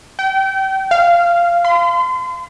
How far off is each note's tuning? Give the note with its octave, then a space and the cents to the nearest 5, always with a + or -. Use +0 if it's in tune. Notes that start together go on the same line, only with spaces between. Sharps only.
G5 -30
F5 -15
C6 -40